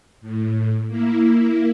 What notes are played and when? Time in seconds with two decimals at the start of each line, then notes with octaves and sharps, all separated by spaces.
0.21 A2
0.87 A#3 E4